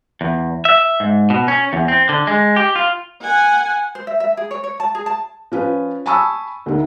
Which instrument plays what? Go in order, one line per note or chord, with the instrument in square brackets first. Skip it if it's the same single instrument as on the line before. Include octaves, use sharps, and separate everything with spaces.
[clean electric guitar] E2
E5
G#2
B2
C#4
E2
C4
D3
G#3
G4
F4
[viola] F#5 G#5
[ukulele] C5
E5
E5
G#4
C#5
C#5
A5
G#4
A5
[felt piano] F3 C#4 B4
G#5 A5 B5 C#6 D#6 E6
D2 D#3